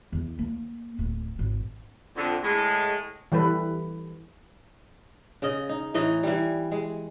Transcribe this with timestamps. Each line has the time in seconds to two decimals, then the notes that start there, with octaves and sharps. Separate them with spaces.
0.12 E2
0.39 A#3
0.99 D1
1.39 G#1
2.16 F2 D3
2.43 A2 G#3
3.32 E3 G3 A4 B4
5.42 C#3 D#5
5.69 D#4
5.94 A2 E3 D#4 D#5
6.23 E3 G3
6.72 G#3